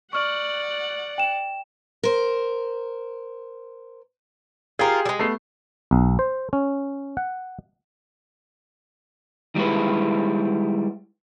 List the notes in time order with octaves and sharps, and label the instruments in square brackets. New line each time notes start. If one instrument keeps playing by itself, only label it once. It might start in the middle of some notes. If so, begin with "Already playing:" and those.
[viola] D5 F#5 [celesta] C#6 F6
[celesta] G5 E7
[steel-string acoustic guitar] A#4 C5
[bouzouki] F4 A#4 [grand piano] G4 G#4
[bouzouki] G3 G#3
[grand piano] A3 B3 C7
[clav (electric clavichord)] B1
C5
C#4
F#5
[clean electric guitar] D#3 G3 G#3 E4 B4